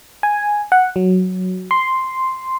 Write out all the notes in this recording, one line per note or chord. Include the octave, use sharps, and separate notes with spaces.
G#5
F#5
F#3
C6